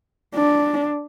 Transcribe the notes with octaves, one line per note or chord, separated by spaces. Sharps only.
D4